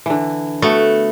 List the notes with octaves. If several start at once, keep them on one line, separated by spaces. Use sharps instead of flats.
D3 E3
A3 B3 F#4